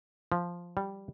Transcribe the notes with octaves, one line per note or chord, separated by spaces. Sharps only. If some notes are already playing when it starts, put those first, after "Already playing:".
F3
G3